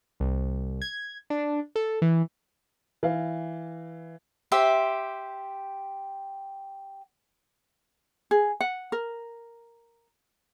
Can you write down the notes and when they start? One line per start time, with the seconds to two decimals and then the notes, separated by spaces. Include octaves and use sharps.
0.20 C2
0.82 G#6
1.30 D4
1.76 A4
2.02 E3
3.03 E3 F5
4.52 G4 C5 E5
8.31 G#4
8.60 F#5
8.92 A#4